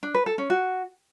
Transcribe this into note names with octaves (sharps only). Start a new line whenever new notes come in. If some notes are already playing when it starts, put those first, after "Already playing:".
D4
B4
A4
C#4
F#4